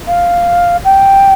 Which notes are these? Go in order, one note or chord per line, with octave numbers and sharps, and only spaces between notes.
F5
G5